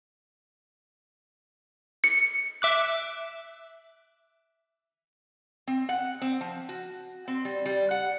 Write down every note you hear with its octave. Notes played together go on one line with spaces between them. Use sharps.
C#7
E5 D6 F#6
C4
F#5
C4
F3
F#4
C4
G3
G3
F#5